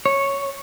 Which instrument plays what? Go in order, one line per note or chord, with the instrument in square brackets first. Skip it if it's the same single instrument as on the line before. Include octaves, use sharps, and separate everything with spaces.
[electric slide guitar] C#5